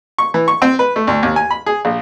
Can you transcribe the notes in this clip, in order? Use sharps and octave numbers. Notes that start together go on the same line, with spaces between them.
C#6
E3
C#6
C4
B4
A3
D2
D#2
G#5
B5
G#4
A#1